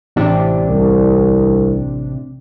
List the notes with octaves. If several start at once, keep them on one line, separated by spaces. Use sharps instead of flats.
A1 C3 D4
C2